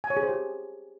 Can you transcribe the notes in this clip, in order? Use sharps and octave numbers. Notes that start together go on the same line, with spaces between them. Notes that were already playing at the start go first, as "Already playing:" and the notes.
G#5
C#5
G#4
C5
G4